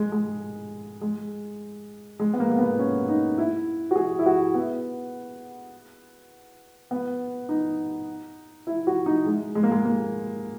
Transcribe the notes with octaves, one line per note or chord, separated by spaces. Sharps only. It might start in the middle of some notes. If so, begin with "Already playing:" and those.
Already playing: G#3
G#3
G#3
G#3
B3
A#3
A#3
B3
C#4
D#4
E4
F#4
G#4
E4
F#4
B3
B3
D#4
E4
F#4
D#4
G#3
G#3
A#3
G#3
A#3